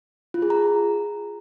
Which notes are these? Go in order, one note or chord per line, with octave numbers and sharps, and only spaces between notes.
F4
G#4
A#5